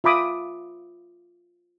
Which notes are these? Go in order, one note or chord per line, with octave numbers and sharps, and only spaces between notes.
F4 E5 B5 D6 D#6